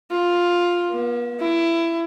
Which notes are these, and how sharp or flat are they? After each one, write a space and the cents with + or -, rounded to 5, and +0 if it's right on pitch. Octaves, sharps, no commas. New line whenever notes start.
F4 +5
B3 -45
E4 +20